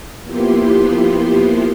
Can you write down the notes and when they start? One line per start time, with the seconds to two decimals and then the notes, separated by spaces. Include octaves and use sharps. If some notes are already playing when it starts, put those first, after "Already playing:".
0.24 F3 A#3 B3 E4 G4 C6